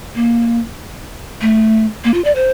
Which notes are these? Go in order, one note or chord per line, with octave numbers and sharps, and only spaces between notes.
A#3
A3
A#3
F4
D5
C5